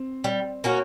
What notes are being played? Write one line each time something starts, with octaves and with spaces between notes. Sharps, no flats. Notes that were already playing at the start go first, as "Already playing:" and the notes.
Already playing: C4
G3
A#3 C#4 F#4